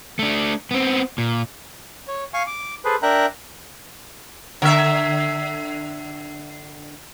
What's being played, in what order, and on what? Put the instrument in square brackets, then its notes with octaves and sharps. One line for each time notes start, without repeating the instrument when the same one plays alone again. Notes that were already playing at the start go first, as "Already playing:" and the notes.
[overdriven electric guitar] A3 D4
B3 C4
A#2
[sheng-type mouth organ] C#5
F5 G#5 C#6
D6
G#4 A4 B4 C5
D4 A#4 E5 G5 A#5 F#6
[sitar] D3 E5